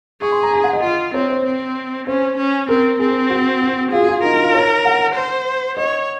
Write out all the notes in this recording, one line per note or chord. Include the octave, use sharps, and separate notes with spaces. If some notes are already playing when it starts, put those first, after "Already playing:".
G#4 C#6
C6
A#5
G#5
F#5
D#5
F4
C4 C#5
C5
C4
C#4 C5
C#4
C4 A#4
C4 G#4
F#4
F#4
F4 G#4
F#4
F4
D#4 A#4
D#4
F4
C#5
F#5
C5
C#5 D#5